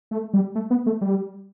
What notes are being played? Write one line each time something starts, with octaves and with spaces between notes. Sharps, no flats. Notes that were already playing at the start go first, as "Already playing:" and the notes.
A3
G3
A3
B3
A3
G3